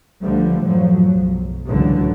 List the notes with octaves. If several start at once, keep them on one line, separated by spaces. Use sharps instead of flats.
C#2 D3 F3 G3 A3
F#2 A2 F3 F#3
B1 G#2
C#2 A2 D3 E3 F#3